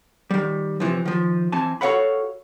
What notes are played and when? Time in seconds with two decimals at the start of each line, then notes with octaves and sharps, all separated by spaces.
0.31 D#3 G3
0.80 C3 E3 F3
1.05 D#3 F3
1.52 E3 C4 G#5 A5
1.81 F#4 A4 C#5 F5 F#5 B5